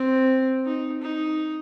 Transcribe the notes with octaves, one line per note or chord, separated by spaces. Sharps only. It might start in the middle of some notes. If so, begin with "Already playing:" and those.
Already playing: C4
D#4
D#4